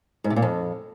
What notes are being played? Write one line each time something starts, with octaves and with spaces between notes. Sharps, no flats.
G#2
C3
A#2
F2